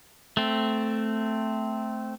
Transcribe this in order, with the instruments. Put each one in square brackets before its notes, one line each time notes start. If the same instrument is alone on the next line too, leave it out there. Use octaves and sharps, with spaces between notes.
[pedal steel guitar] A3 C4